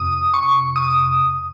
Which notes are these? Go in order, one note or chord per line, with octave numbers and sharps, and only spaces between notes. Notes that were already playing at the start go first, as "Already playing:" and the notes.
Already playing: F2 C3 D#6
C#6
D#6